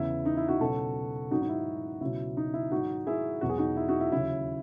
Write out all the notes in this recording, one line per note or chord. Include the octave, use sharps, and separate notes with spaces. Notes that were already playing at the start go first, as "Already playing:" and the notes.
Already playing: E2 C#3 E3 E4
D#4
E4
D#4 F#4
C#2 B2 F#3 F#4 A4
G#2 D#3 F#3 D#4 F#4
D#4
E4
C#2 B2 F#3 E4
D#4
E4
G#2 D#3 F#3 D#4 F#4
E4 G#4
E2 B2 F#3 F#4
G#4
D#4 F#4
E4
D#4 F#4
E4
D#2 C#3 F#3 E4